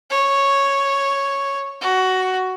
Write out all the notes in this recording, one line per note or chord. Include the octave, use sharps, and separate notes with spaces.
C#5
F#4